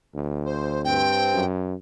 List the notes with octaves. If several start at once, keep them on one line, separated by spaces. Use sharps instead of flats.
D2
C5
G2 C4 G5
F#2